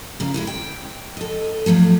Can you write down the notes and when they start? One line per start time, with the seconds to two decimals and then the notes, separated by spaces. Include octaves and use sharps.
0.20 C#3 A#3 F4
0.34 G#3 A3 E4
0.47 G5
1.17 A4 D#5
1.66 E2 F3 F#3 A3